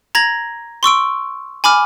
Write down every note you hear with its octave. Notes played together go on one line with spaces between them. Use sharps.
A#5 G#6 A#6 F#7
C6 C#6 E6 D7
G#5 B5 D6 F6